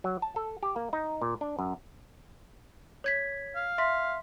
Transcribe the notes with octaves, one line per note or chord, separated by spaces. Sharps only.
F#3
A5
A4
G4
A#3
D#4
A#2
D4
F#2
C#5 G#6 B6
F5
E5 C6 B6